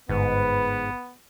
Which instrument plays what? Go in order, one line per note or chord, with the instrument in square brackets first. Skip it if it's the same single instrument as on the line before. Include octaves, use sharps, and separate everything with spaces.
[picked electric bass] G1 [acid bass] G#2 [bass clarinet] B3 [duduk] B4